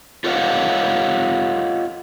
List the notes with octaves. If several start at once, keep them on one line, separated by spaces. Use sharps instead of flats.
F4 A4 C#5 D#5 F5 F#5